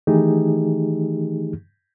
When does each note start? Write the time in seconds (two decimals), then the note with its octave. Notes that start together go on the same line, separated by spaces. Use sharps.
0.07 D#3 E3 A3 D#4 G4 G#4